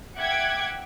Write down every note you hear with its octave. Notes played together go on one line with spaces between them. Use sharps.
E5 F#5 G5 D6 F#6 G#6